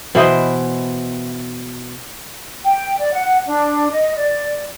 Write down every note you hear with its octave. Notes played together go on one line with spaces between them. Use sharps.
B2 E3 C5 D#5
G5
D5
F#5
D4
D#5
D5